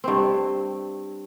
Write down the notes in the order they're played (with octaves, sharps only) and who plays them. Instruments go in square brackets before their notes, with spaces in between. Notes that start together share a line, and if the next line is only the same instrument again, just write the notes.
[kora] G2 C4